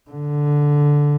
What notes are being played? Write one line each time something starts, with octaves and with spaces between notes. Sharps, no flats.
D3